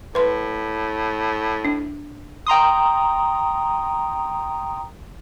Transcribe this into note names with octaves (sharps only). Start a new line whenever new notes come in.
A2 B4 C6
D4
G5 A#5 C6 D#6